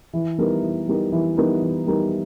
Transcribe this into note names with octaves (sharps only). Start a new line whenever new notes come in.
E3
G3 B3 D#4 A#4
E3
G3 B3 D#4 A#4
E3
G3 B3 D#4 A#4
E3
G3 B3 D#4 A#4